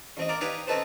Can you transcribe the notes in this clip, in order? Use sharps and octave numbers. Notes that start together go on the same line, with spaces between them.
A1 C4 D#5
A#3 A#4 D5
D4 D#4 G4 B4 F5 G#5
C4 C#4 D#4 A4 B4 C5